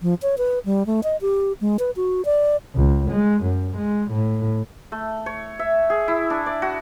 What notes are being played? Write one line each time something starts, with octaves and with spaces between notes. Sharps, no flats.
F3
C#5
B4
G3
A3
D#5
G4
G#3
B4
F#4
D5
C#2
G#3
F#2
G#3
A2
A3
C#5
E5
G#4
E4
D4
D5
F#4